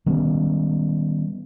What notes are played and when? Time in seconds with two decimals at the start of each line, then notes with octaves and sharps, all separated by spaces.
0.06 D#3 G3 B3 C#4